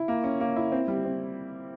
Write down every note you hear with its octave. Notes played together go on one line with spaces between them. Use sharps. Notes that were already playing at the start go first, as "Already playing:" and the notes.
Already playing: E4
A#3
C#4
A#3
E4
C4
G3
C4